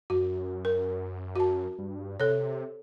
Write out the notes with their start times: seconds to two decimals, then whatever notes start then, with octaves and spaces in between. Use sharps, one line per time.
0.10 F#2 F#4
0.65 A#4
1.36 F#4 A5
1.78 G2
2.20 C3 A4 C#5